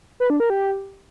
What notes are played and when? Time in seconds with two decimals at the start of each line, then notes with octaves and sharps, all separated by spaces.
0.20 B4
0.30 D4
0.40 A#4
0.50 G4